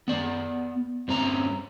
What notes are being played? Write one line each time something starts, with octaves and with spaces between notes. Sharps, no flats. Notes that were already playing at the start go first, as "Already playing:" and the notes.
B3 D5
G2 C4 C#4 A#5